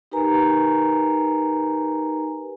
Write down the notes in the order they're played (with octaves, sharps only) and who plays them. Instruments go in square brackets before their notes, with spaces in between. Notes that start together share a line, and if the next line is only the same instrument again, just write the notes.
[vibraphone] D#4 G4 A#4 B4 G#5 A#5